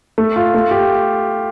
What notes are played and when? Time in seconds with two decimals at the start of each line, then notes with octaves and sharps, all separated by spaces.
0.18 A3
0.36 F4
0.54 A3
0.71 G4